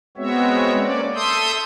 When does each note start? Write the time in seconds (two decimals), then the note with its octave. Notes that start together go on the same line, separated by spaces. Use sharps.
0.17 G#3 B3 C4 F#4 C#5 E5
0.80 A#3 C#4 D5
1.15 A4 E5 C6 D#6 E6 G6